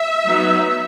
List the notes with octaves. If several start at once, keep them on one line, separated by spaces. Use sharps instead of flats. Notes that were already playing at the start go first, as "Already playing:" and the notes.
Already playing: E5
F#3 B3 D#4